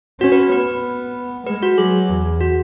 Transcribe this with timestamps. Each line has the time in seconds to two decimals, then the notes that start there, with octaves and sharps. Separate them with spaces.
0.21 C#4 F#4
0.32 B4
0.52 B3 B4
1.46 G#3 B4
1.63 F#4
1.78 F#3 G#4
2.09 E2
2.41 F#4